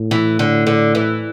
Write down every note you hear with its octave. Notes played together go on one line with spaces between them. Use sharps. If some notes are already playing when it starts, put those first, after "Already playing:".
Already playing: A2
E3
D3
D3
E3